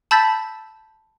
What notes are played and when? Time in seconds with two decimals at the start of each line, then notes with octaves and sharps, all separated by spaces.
0.11 A5 B5 E6 G6 A6 B6